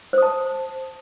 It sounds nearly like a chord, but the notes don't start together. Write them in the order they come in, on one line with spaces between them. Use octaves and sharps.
C5 D#6 A5